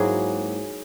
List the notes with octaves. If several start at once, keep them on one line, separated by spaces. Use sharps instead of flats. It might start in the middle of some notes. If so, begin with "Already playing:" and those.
Already playing: G#2 F#3 A#3 E4 G#4